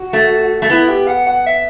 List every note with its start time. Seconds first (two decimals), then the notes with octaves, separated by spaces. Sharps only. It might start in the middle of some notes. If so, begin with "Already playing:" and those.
Already playing: F#4
0.13 A3
0.62 A3
0.70 B3 E4
0.89 G4
1.08 F#5
1.27 F#5
1.46 E5